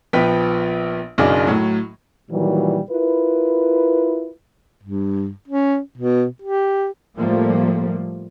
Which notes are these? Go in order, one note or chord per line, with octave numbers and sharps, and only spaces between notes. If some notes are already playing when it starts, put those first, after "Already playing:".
A#1 F3 B3 B4 G5 B6
F#1 B1 C#3 D4 G#4 D6
A2 F#3
A#2 D#3 E3 F#3 G3
E4 F4 A#4 B4
G2
C#4
B2
G4
A2 F3 G3 A3 A#3